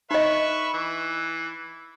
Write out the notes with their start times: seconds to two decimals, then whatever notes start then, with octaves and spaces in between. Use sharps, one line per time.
0.11 D#4 B4 D#5 E5 C#6
0.74 E3